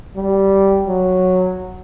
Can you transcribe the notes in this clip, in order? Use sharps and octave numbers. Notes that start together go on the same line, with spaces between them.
G3
F#3